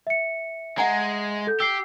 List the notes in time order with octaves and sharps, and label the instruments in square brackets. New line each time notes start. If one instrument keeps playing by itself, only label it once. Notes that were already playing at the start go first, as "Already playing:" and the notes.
[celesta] E5 C#7
[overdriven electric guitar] G#3 [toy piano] F#5 G#5 A#5
[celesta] A4 G6
[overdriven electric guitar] G4 [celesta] E6 C7